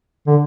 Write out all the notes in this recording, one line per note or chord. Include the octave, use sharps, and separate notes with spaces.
D3